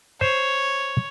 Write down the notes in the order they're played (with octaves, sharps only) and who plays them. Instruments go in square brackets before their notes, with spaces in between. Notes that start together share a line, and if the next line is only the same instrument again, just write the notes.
[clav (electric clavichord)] C5 [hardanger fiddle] C#5